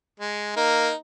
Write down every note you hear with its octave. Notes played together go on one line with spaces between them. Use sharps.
G#3
A#3 D#4